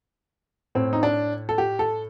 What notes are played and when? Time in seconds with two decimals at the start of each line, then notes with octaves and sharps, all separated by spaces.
0.75 A2 C4
0.93 D#4
1.03 D4
1.49 A4
1.58 G4
1.79 A4